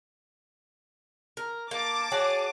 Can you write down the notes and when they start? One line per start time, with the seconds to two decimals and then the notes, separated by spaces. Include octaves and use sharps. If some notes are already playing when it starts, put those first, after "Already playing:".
1.37 A#4
1.71 A#3 A5 D6 A6
2.12 F#4 G#4 C#5